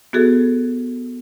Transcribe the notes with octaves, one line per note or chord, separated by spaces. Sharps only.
B3 F#4 G#4 A4